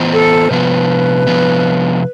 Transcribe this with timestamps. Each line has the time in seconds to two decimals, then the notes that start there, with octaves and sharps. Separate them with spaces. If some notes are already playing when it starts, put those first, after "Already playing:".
Already playing: E3 B3 F4 C5
0.13 A4
0.51 C3 F3 B3 B4
1.27 C3 F3 B3